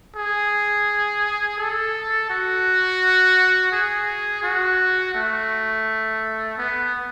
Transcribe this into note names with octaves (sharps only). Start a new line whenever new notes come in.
G#4
A4
F#4
G#4
F#4
A3
B3